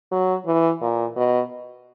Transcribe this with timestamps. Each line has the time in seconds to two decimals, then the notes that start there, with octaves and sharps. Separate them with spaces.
0.12 F#3
0.46 E3
0.81 A#2
1.16 B2